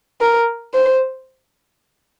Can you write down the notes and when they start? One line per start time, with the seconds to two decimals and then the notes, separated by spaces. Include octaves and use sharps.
0.21 A#4
0.74 C5